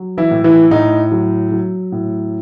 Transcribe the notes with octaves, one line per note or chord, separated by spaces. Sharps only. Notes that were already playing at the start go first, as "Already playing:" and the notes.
Already playing: F#3
E3 E4
A2
E3 E4
A2 D#4
F#3
F#3
A2